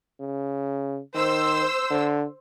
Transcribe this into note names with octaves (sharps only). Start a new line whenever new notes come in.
C#3
D#3 C5 E6
D3